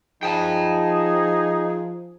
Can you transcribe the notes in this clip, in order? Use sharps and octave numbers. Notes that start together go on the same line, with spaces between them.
F3 D#4 G#4 G5 A5